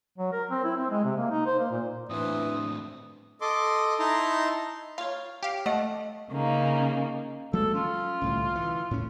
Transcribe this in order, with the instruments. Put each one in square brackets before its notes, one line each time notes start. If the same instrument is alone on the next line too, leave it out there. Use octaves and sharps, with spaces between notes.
[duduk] F#3
A#4
C4
E4
C4
G#3
C3
A#3
D#4
C5
A#3
A#2
[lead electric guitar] A2 C4 [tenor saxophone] E3 [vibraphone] D4 C6 [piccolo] D#6
[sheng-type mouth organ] A4 D#5 C6 D6
D#4 E4 A5 A#5 C6
[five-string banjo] F4 C#5 [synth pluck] F5
[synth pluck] G4 F5
[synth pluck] A3 [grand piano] D#5 [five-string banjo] F#5
[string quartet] C#3 A#3 D#4
[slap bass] F#3 G#3 A#3 [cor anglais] A4
[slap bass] C#4 [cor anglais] F4
[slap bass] C2 A2 D3
E3
A2 C#4